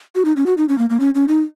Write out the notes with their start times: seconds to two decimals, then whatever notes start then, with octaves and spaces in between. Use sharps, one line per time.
0.15 F#4
0.25 D#4
0.37 C#4
0.46 F#4
0.57 D#4
0.69 C#4
0.78 A#3
0.90 A#3
1.00 C#4
1.15 C#4
1.28 D#4